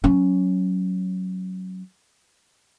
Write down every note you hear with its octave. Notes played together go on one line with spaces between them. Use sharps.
F#3 C#4